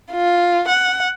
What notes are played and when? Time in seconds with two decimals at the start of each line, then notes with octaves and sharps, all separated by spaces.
0.12 F4
0.68 F#5